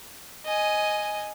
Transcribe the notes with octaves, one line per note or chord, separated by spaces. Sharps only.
D#5 G#5